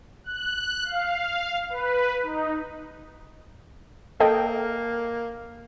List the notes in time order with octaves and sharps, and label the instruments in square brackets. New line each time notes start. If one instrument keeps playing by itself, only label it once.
[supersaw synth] F#6
F5
B4
D#4
[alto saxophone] A#3 [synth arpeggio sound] A4 D#5 G5